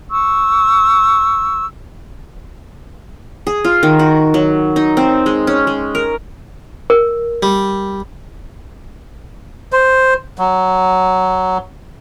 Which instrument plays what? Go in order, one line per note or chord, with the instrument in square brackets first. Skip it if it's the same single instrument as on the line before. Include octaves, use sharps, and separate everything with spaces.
[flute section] C#6 E6
[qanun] G#4
F4
D#3
F#4
F#3
D#4
C4
G#3
C#4
G#3
A#4
[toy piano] A#4
[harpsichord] G3
[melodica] C5
F#3